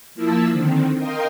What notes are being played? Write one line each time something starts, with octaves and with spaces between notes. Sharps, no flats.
F3 A#3 E4 A5 E6
D3 D#3 C4
A#4 D#5 F5 G5 C6